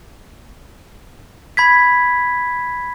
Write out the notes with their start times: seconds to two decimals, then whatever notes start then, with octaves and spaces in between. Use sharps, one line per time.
1.57 B5 G#6 B6